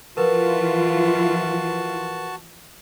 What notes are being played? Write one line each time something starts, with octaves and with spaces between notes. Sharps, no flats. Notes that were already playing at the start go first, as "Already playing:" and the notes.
E3 F3 F4 F#4 A#4 B4 A5